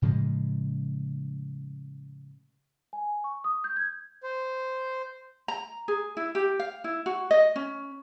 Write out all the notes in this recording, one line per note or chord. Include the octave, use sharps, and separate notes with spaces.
A2 C#3 F3 G#3
G#5
C#6
D#6
G6
G#6
C5
A#5
G#4
E4
G4
F5
E4
F#4
D#5
C#4